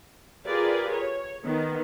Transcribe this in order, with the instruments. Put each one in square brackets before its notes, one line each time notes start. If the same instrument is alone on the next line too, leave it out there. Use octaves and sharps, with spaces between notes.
[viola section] F4 G4 G#4 A#4 B4 D5
C#5
D#3 B3